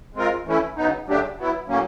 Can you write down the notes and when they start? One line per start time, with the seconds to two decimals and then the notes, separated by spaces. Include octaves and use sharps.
0.15 G#3 C4 F4 A#4
0.46 E3 A3 C#4 E4
0.76 C#3 F#3 B3 D#4
1.07 C#3 F#3 A3 D4 G4
1.37 F#3 B3 E4
1.68 A2 F#3 A#3 C#4